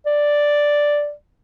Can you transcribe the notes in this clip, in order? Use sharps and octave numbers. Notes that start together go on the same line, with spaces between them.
D5